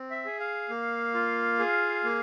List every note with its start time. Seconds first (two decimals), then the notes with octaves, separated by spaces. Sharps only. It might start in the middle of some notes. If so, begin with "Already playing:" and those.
Already playing: C4
0.10 E5
0.25 G#4
0.40 F5
0.69 A#3
1.14 F4
1.59 G#4
2.04 A#3